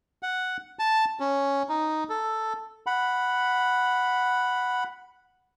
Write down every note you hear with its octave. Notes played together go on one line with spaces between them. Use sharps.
F#5
A5
C#4
D#4
A4
F#5 B5